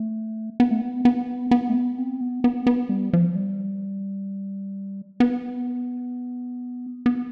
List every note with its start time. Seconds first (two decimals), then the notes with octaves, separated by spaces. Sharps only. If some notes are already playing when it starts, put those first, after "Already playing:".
Already playing: A3
0.60 B3
0.71 A3
0.82 B3
1.05 B3
1.51 B3
1.69 A3
1.75 B3
1.98 C4
2.21 B3
2.44 B3
2.67 B3
2.89 G3
3.13 F3
3.35 G3
5.20 B3
7.06 B3